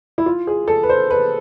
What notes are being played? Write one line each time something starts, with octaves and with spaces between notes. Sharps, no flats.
E4
F4
G#4
A4
B4
C5
B4